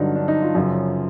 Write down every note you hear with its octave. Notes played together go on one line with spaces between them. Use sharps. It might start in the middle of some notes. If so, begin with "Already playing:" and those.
Already playing: G2 D3 F#3 D#4
D4
D#4
F4
F#2 C#3 F3